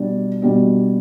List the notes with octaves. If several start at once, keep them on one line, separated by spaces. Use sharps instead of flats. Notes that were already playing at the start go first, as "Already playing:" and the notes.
Already playing: B2 G3 D4
B2 G3 D4